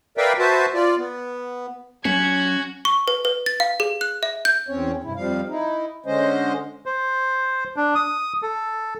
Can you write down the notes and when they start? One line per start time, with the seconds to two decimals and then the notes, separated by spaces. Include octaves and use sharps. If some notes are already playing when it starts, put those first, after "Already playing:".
0.17 A#4 B4 D5 E5 F5 G5
0.39 F#4 B4 C5 E5 A5
0.74 F4 D5
0.98 B3
2.05 F#3 C#4 F#4 G#6
2.85 C#6
3.08 B4
3.25 B4
3.46 A6
3.60 F5
3.80 G#4
4.01 F#6
4.23 E5
4.45 G6
4.68 E2 C4 C#4 C#5
5.04 G2 C3 E4
5.16 F2 F3 G3 F5
5.49 D#4 E4
6.06 D3 G#3 C#4 C5 D#5
6.86 C5
7.76 D4
7.95 D#6
8.42 A4